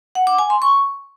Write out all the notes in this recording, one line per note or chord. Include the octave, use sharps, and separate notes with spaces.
F#5
D6
G#5
C6
C#6